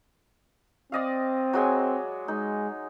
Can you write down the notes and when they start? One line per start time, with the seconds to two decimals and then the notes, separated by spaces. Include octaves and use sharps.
0.92 C4 D5 D#5 F5
1.53 F#3 G#3 G#5
2.28 G#3 D#4